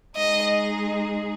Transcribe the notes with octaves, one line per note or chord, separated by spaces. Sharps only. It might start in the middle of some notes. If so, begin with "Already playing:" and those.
G#3 D#4 G#4 D#5